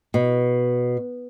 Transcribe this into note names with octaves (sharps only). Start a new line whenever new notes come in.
B2